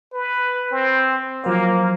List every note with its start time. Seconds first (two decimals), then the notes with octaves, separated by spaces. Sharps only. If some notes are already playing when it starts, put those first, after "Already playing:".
0.13 B4
0.72 C4
1.44 F3 F#3 A#3 C5